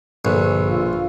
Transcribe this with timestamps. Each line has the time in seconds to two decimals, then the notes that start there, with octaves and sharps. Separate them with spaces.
0.25 A#1 G2 B2 D3 A4 B4 C#6
0.68 D4 F4 E6